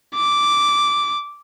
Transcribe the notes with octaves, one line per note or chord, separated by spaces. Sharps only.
D6